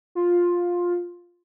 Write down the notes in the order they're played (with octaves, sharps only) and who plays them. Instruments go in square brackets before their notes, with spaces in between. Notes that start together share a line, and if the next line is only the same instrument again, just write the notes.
[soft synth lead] F4